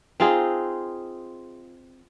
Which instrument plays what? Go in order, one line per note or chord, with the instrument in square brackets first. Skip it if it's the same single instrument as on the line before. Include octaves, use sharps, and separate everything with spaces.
[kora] C4 D#4 F4 G#4